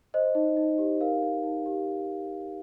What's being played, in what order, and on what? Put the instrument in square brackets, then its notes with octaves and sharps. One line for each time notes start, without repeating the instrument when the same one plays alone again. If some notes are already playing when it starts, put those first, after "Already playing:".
[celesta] C5 D#5
D#4
D#4
G4
A#4 F5
D#4
D#4
G4